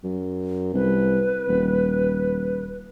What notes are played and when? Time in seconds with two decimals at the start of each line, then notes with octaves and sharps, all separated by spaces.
0.04 F#2
0.74 C2 B4
1.48 D#1